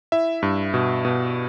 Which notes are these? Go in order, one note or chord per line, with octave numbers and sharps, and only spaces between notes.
E4 E5
G2
B2
B2